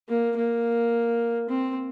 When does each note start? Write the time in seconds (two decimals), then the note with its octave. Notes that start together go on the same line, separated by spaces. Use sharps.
0.09 A#3
0.36 A#3
1.49 C4